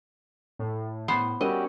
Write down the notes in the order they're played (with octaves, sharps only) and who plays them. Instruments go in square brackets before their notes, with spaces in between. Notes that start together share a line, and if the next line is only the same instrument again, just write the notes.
[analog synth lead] A2
[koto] B3 C5
[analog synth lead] G3 [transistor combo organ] C#4 F#4 G4 [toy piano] A#4 [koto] D#5